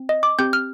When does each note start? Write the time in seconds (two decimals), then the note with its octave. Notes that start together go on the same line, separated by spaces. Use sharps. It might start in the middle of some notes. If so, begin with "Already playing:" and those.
Already playing: C4
0.09 D#5
0.23 D6
0.39 C4 G4 G6
0.53 F6